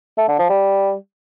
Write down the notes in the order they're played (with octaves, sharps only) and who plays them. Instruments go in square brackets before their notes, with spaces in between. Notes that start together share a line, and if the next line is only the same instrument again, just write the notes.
[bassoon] A3
D3
F3
G3